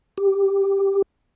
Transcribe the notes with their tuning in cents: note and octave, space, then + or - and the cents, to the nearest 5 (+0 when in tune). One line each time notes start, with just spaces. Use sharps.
G4 +5